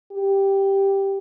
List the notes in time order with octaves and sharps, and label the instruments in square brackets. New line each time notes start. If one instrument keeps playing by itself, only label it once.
[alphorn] G4